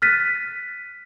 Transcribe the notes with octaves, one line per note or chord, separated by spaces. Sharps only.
F6 F#6 A6 B6 D#7